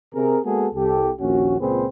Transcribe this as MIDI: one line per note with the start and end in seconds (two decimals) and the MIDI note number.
0.14 0.38 48
0.14 0.38 68
0.14 0.38 70
0.44 0.67 56
0.44 0.67 58
0.44 0.67 59
0.44 0.67 66
0.44 0.67 68
0.44 0.67 69
0.74 1.11 36
0.74 1.11 67
0.74 1.11 69
1.20 1.57 34
1.20 1.57 39
1.20 1.57 61
1.20 1.57 66
1.60 1.86 37
1.60 1.86 46
1.60 1.86 60
1.60 1.86 68
1.60 1.86 71
1.60 1.86 72